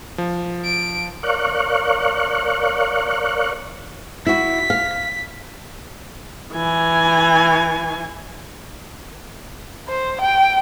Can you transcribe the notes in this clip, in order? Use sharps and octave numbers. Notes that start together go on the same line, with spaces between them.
F3
D7
A#4 C#5 D5 F5 C#6 F#6
E4 F#4 B6
F5
E3 G#5
C5
G5